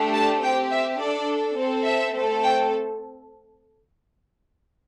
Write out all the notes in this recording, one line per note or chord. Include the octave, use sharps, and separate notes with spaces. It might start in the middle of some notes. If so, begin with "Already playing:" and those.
Already playing: A3 D4 G4
A5
C4 G4 G5
E5
D4 A4 D5
C4 A4
E5
A3 C4 A4
G5